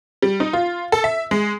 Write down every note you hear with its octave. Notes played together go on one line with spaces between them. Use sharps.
G3
D#4
F4
A4
E5
G#3